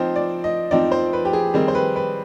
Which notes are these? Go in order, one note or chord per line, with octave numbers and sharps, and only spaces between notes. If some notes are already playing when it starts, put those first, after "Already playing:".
Already playing: F3 C4 D#4 C5
D5
D#5
F3 C4 D#4 D5
C5
B4
G4
G#4
D#3 G3 C4 D#4 G#4
C5
B4
B4